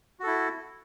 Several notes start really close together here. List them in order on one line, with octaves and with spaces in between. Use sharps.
F#4 A4 E4